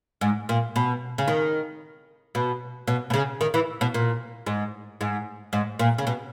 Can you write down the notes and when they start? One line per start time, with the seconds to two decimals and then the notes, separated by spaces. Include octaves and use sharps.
0.21 G#2
0.49 A#2
0.76 B2
1.18 C#3
1.28 D#3
2.35 B2
2.88 B2
3.10 B2
3.14 C#3
3.41 D#3
3.54 E3
3.81 B2
3.94 A#2
4.46 G#2
5.01 G#2
5.53 G#2
5.79 A#2
5.98 C#3
6.07 B2